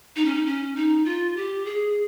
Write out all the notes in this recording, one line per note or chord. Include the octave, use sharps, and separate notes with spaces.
D#4
C#4
D#4
C#4
D#4
F4
G4
G#4